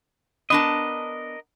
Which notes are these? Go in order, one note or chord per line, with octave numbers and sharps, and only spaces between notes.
B3 D4 A#4 D#5 A5